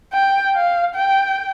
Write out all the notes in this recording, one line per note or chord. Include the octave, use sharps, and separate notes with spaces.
G5
F5
G5